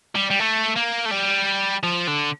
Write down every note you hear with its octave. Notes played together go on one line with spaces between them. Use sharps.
G3
G3
A3
A#3
A3
G3
F3
D3